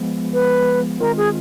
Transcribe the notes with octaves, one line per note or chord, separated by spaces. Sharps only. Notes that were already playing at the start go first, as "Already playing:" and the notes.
Already playing: F3 G#3 B3
B4
D#3 G#3 C4 F4 A#4
G#4